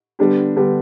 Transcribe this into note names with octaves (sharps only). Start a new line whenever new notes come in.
D3 G3 B3 D4 G4
D3 G3 B3 D4 G4